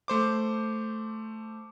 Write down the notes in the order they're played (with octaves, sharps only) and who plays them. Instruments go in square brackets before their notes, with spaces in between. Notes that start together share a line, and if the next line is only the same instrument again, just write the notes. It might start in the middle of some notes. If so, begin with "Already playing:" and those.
[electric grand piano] A3 C5 D6